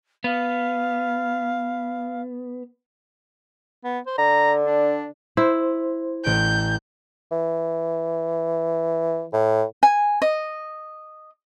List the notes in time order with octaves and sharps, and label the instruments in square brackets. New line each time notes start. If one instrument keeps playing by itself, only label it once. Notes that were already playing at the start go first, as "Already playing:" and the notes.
[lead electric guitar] B3 [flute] F5
[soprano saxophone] B3
C5
[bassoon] D3 [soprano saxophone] A#5
[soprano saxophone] D4
[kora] E4 [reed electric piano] C5
[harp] A1 D7 [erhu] G6
[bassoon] E3
A2
[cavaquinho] G#5
D#5